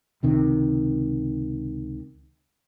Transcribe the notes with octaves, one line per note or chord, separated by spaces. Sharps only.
C#2 C3 D#3